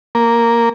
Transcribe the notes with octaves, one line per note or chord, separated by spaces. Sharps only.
A#3